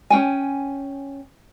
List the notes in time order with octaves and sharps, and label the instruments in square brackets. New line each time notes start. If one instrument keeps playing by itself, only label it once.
[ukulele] C#4 D4 G5 G#5